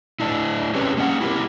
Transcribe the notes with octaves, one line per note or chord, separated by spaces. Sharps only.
A3 D4 E4
C4 C#4 G4 G#4 B4 C#5
A#3 C#4 C#5 F#5
E4 G4 A4 A#4